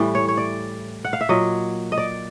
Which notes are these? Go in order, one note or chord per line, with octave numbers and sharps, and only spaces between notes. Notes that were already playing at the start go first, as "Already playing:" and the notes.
Already playing: A2 E3 G3
C#5
C#5
D5
F#5
F5
E5
A#2 F#3 D#5
D#5
D5